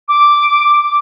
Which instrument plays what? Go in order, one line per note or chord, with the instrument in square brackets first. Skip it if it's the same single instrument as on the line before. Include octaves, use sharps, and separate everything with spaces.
[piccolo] D6